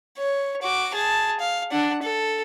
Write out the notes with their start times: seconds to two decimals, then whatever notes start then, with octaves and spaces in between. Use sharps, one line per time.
0.18 C#5
0.62 F#4 D6
0.95 G#4 A5
1.40 F5
1.71 D4 F#5
2.03 A4